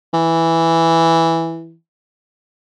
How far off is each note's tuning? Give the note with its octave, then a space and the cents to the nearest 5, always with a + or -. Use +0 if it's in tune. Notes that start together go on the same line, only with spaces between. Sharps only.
E3 +0